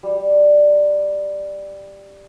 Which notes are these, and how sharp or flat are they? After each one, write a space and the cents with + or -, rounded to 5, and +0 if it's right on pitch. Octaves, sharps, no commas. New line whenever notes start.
G3 +5